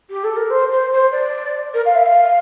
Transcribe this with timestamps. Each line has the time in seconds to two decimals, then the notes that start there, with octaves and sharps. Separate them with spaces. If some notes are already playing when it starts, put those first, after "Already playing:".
0.10 G4
0.23 A4
0.36 A#4
0.50 C5
0.71 C5
0.92 C5
1.11 D5
1.74 A#4
1.85 F5
1.95 E5
2.05 F5